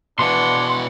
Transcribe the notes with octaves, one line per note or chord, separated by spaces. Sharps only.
B2 E3 D4 F#5 C6